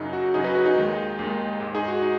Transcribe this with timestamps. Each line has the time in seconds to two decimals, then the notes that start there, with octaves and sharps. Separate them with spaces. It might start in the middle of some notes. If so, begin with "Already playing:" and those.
Already playing: F#2 C#3 F#3 D#4
0.13 F#4
0.34 F#2 C#3 F#3 D#4 G#4
0.44 F#4 B4
0.55 F#4
0.65 D#4 G#4
0.76 D#2 D#3 G#3
1.19 D#2 D#3 G#3
1.60 G#2 G#3
1.75 D#4 G#4
1.88 F#4
2.02 D#4